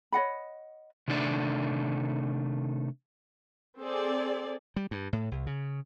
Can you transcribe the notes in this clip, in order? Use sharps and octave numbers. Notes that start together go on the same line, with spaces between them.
C#5 D#5 F#5 B5
C3 D#3 A3 D4 D5
C4 G#4 A4 D5
G3
G2
A2
C2
C#3